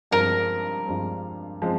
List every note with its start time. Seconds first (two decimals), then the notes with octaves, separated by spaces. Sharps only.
0.11 G2 F3 G#3 C4 A#4
0.86 G2 F3 G#3 C4
1.62 F3 G#3 C4